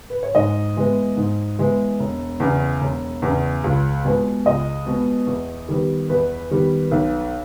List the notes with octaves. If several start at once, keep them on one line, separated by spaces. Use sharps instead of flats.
B4
C#5
G#2 D#5
E3 G#3 B3
G#2
E3 G#3 B3
E1
E2 C#3
E1
E2
C#3
C#2
B2 G#3 B3
C#2 D#5
B2 G#3 B3
E2
D#3 G3 B3
E2 B4
D#3 G3 B3
B1